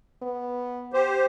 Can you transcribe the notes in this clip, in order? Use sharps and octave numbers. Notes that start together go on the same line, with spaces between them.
B3
G4 C5